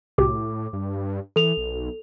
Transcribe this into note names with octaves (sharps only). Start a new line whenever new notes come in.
C2 A2 F#4 G4 D6
G2
E3 A4 F7
B1